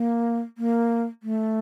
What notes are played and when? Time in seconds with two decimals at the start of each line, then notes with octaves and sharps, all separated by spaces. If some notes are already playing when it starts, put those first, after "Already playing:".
Already playing: A#3
0.58 A#3
1.23 A3